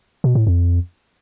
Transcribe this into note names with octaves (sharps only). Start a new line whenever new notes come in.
B2
A2
F2